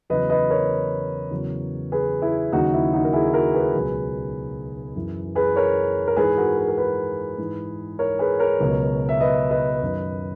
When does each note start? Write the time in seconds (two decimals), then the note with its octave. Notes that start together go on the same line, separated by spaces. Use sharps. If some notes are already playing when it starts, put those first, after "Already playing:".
0.10 E2 C#3 F#3 B4 D#5
0.30 B4 D#5
0.50 A#4 C#5
1.30 E2 C#3 F#3
1.92 G#4 B4
2.22 E4 G#4
2.52 D#2 C#3 F#3 D#4 F#4
2.73 E4
2.93 D#4 F#4
3.04 A#4
3.13 E4 G#4
3.34 F#4 A#4
3.54 G#4 B4
3.74 C#2 B2 F#3
4.96 F#2 E3
5.35 G#4 B4
5.56 A#4 C#5
6.07 A#4
6.17 G#2 E3 G#4 B4
6.37 F#4 A#4
6.57 B4
6.67 A#4
6.77 G#4 B4
7.38 G#2 E3
7.99 A#4 C#5
8.19 G#4 B4
8.39 A#4 C#5
8.60 C#2 B2 F#3
9.09 E5
9.21 B4 D#5
9.51 B4 D#5
9.82 F#2 D#3 F#3